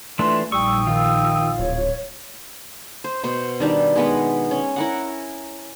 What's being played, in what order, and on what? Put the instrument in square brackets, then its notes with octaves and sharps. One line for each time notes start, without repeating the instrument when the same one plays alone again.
[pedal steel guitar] E3 A3 D4 [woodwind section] F4 B4 C6
[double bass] A#1 D#4 [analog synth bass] G3 [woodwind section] G5 D#6 E6 [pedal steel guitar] C#6
[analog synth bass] D#3 [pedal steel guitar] F4
[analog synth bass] D1 [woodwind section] C#5
[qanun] C5
B2 C5
D#3 G3 D4
G#3 B3 B4
C#4
E4 A#4 F#5